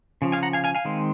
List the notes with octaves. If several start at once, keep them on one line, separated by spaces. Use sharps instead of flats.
C#3 F3
F5 G#5
F#5 A#5
F5 G#5
F5 G#5
F5 G#5
D#3 G#3 C4